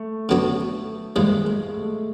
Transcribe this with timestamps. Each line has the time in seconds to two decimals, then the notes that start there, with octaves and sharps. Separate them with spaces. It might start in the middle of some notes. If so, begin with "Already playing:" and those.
Already playing: A3
0.29 D3 F#3 B3 D4 F#4
1.15 G#2 D#3 G3 G#3 A#3
1.45 G#3
1.73 A3